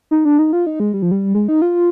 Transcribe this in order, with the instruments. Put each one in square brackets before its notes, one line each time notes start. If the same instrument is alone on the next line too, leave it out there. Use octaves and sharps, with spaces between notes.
[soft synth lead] D#4
D4
D#4
F4
D#4
G#3
G3
F3
G3
G#3
D#4
F4